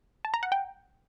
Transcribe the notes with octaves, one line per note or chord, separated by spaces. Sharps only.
A5
A#5
F#5
G5